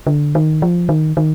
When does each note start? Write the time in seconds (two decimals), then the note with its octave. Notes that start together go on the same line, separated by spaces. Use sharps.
0.07 D3
0.35 D#3
0.62 F3
0.89 D#3
1.17 D#3